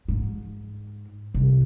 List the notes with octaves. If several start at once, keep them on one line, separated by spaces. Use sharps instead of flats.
G#2
C2